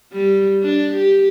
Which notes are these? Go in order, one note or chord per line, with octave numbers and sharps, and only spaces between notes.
G3
D4
G4